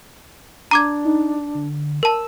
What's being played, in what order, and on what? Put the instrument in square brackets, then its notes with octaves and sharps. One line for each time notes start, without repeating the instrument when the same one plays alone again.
[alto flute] D4 [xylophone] A#5 D6 G#6
[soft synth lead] D#4
D3
[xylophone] A#4 A5 [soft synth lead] E6